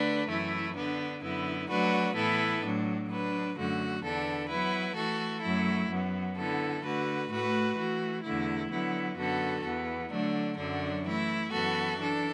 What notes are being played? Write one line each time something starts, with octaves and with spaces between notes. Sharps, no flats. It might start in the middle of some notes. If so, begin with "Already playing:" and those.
Already playing: D3 A3 D4 B4
F#2 E3 A3 E4
D3 B3 D4
F#2 D3 B3 E4
F#3 A3 D4 F#4 B4
A2 E3 B3 E4 A4
A2 F#3 D4
F#3 D4 B4
F#2 D3 A3 F#4
E2 D3 B3 D4 A4
F#3 B3 E4 B4
E3 A3 F#4 A4
F#2 F#3 A3 E4
F#2 F#3 B3
D3 B3 E4 A4
D3 A3 F#4 B4
A2 A3 F#4 B4
E3 A3 F#4
E2 D3 A3 E4
D3 F#3 B3 E4
F#2 D3 B3 F#4 A4
E2 E3 B3
D3 F#3 A3 D4
F#2 D3 F#3 D4
E3 A3 E4
F#2 E3 B3 F#4 A4
E3 D4 A4